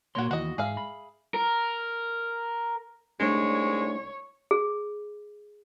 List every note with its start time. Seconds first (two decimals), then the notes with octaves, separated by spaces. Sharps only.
0.15 A#2 A#3 F#4 C#5 C6
0.31 D#2 E3 F#4 D#5
0.58 G#2 G#4 E5 F5
0.77 B5
1.34 A#4
3.20 C2 G#3 A3 D4 D#4 C#5
4.51 G#4